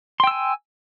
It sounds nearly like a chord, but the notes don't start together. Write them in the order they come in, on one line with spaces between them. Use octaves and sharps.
C6 G5 E6 G#5